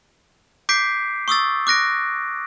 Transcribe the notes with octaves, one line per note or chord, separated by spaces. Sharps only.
D6 G6 B6 C7 D7
C#6 D#6 E6 A6
D6 F#6 A#6 D7